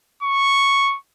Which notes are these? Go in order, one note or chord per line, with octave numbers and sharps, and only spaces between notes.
C#6